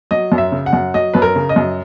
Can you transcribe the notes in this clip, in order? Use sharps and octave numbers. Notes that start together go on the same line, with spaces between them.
F#3 D#5
F#2
E5
C#3
F#5
F#2
F#3 D#5
F#2 B4
A#4
C#3
D#5
F#2